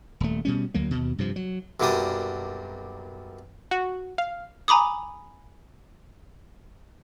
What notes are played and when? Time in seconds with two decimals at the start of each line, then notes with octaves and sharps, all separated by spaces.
0.20 D#1 A3
0.45 B2 G3 C#4
0.74 D2 F#3 A#3
0.91 D#2 B2
1.18 G2 C3 F3
1.36 F#3
1.80 B1 F#2 A#2 G3 D4 D#6
3.71 F#4
4.18 F5
4.68 G#5 A#5 B5 D6 D#6